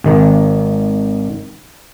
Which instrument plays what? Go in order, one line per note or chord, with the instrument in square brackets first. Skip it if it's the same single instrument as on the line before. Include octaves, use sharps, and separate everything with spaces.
[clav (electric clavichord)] G#1 D#3